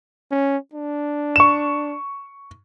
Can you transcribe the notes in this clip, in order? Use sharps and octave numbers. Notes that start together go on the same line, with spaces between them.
C#4
D4
C#6 E7